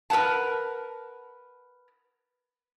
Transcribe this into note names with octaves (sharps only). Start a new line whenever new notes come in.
A#4 B4 C#5 F#5 A5